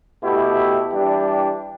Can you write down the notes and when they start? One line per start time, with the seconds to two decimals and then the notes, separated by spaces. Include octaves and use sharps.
0.21 B2 A3 E4 G4
0.90 E3 G3 D4 G4